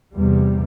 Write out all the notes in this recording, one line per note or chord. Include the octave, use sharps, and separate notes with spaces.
E2 C3 G3